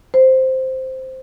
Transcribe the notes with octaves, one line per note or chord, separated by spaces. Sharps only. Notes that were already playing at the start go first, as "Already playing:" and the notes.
C5